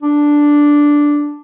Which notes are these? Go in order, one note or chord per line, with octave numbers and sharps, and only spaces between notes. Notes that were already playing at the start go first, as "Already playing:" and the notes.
D4